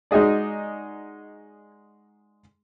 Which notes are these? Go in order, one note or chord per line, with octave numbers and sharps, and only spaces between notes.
G#3 D#4 F#4 G#4 D5